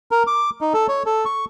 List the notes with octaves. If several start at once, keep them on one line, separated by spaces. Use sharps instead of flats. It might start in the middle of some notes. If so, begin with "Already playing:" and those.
A#4
D6
D#4
A4
C#5
A4
C#6